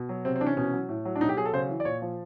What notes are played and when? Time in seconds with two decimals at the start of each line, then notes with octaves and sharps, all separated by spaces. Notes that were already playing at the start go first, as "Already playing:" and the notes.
Already playing: B2
0.09 F#3
0.25 C3 C4
0.36 C4
0.41 E3 D4
0.47 C#4
0.57 B2 C#4
0.73 F#3
0.89 A2
1.05 F#3
1.16 D4
1.21 B2 D#4
1.29 G4
1.37 F#3 G#4
1.45 A4
1.53 C#3 C5
1.69 E3
1.80 D5
1.85 A#2 C#5
2.02 F3